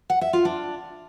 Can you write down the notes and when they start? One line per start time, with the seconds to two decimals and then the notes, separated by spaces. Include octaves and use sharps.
0.10 F#5
0.21 E5
0.33 F4
0.45 D4